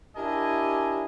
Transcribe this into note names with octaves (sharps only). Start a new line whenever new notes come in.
D4 E4 G4 A#4 D#5 G#5